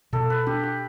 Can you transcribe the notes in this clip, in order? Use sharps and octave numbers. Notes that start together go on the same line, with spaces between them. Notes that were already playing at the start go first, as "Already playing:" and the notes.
B2 A4
B4
D4 G4
G4